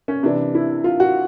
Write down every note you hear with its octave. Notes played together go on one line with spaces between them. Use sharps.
C#4
C3 E3 D4
E4
F4
F#4